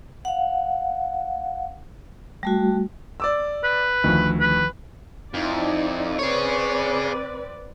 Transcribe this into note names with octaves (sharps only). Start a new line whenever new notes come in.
F5 F#5
G3 A3 F#4
D5 D6 E6
B4
D2 D#3 F3
B4
F2 D#4 E4 D5
C4 G#4 B4 C#5 D5